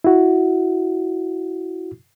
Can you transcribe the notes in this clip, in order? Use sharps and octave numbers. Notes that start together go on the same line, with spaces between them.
E4 F#4